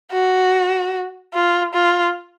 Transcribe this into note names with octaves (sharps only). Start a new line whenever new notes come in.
F#4
F4
F4